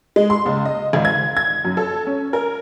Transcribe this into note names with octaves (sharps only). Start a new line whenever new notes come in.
G#3
C6
C#2
D#5
G#1
G#6
G#6
F#2
A4
C#4
A#4